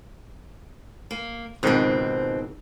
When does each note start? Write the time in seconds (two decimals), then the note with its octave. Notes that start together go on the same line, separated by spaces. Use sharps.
1.11 A#3
1.63 C#2 G#2 B2 D#3 C4